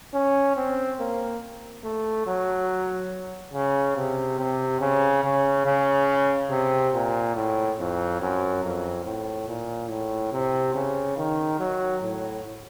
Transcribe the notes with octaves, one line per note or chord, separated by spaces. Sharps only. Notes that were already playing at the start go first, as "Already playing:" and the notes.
C#4
C4
A#3
A3
F#3
C#3
C3
C3
C#3
C#3
C#3
C3
A#2
A2
F2
F#2
F2
A2
A#2
A2
C3
C#3
D#3
F#3
A2